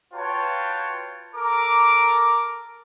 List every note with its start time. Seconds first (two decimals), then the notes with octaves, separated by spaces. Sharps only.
0.14 F4 F#4 B4 C#5 G5 A5
1.34 A4 A#4 A#5 D6